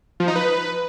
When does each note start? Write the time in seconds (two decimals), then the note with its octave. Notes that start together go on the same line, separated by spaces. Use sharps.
0.20 F3
0.28 D#4
0.35 B4